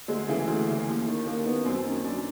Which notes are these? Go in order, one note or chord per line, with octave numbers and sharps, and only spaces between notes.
D2 G#3
C#3 E3 A3
D2
C#3 E3
D#2
D#3
D#2 A#3
D#3 B3
F#2 C4
D#3 C#4
F#2 D4